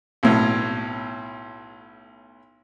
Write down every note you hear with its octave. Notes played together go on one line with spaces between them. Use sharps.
B1 A2